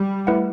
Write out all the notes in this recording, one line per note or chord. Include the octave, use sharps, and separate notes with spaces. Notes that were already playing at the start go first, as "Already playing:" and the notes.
Already playing: G3
A3 E4 B4 F#5